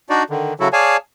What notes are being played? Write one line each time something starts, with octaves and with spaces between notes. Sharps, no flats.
D4 D#4 F#4 D5
D3 D#3
C#3 F#3 E4 F#4 A4
G#4 C#5 D5 F5 G#5 A5